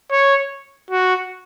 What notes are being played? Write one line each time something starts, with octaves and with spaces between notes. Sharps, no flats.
C#5
F#4